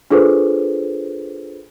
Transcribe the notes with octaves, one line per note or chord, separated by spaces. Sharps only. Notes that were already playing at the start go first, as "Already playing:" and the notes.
D4 F4 G#4 A4 B4 C5